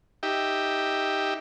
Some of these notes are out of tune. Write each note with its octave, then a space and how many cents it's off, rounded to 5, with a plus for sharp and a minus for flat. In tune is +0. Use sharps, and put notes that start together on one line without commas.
D#4 +0 G4 +0 E5 +0